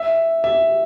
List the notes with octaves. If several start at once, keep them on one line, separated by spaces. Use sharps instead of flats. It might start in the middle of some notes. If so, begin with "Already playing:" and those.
Already playing: E5
E5